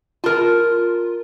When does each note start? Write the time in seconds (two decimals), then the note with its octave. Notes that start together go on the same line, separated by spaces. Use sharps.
0.24 F4 A#4 A5